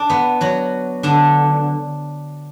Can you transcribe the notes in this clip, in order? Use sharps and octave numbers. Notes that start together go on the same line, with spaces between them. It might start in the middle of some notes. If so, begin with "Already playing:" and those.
Already playing: D4 D5
B3 B4
F#3 F#4
D3 D4